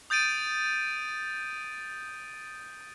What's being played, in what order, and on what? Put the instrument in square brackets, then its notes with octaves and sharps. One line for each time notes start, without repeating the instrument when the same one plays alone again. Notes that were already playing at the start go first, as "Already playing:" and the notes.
[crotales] D#6 G6 A6 D7 D#7